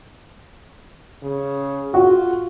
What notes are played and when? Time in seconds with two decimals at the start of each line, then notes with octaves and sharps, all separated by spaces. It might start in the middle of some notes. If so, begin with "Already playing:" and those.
1.23 C#3
1.94 F4 F#4